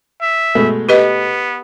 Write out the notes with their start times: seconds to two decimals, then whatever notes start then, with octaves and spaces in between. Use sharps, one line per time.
0.22 E5
0.55 B2 G#3 A3
0.89 B3 G4 B4 D#5